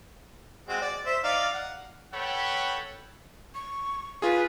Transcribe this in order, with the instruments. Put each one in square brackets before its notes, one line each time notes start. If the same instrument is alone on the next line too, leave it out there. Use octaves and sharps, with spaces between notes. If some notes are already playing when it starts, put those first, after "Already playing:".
[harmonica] G#3 C4 F#4
D5
C5 E5
D#4 D5 F5
F#5
[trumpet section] A4 B4 C#5 F#5 G5 B5
[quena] C#6
[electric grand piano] F4 G#4 [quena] B4